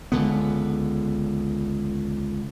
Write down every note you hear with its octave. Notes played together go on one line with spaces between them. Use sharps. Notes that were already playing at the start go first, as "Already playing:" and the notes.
C#2 D3 B3